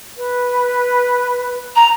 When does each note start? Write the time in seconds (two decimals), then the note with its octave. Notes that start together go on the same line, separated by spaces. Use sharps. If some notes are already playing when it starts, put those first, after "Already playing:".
0.18 B4
1.76 A#5